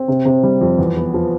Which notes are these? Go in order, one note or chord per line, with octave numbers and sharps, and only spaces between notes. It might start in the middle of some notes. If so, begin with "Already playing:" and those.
Already playing: C4
C3
C3
G3
F2
E2
B3
F3